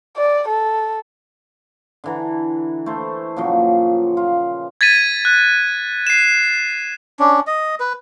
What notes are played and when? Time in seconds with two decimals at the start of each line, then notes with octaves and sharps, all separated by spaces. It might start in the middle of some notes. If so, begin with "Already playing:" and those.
0.17 D5
0.48 A4
2.04 D3 E3 A#5
2.86 A3 E4 C5
3.36 A#2 C#3 F3 F#3
4.17 F4
4.81 G#6 A6 B6 D#7
5.25 F#6
6.07 C7 E7
7.20 C#4 D4
7.47 D#5
7.80 B4